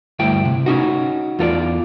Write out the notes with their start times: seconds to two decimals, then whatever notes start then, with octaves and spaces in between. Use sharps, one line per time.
0.19 D2 G2 E4 G5
0.45 C3
0.66 C#4 D#4 F#4
1.39 E2 F4 A4 D5